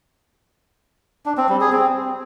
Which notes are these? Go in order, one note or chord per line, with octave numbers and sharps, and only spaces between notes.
D4
C4
G3
G#4
C4